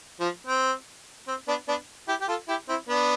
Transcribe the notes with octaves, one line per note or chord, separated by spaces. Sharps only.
F3
C4
C4
B3 D4
B3 D4
E4 G4
G4
F4 A4
E4 G4
C4 E4
B3 D4